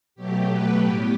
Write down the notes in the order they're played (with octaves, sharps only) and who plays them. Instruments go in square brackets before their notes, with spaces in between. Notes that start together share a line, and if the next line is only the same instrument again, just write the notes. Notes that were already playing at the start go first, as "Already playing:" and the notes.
[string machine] B2 F#3 A3 G4
B4
A2 G3 B3 G4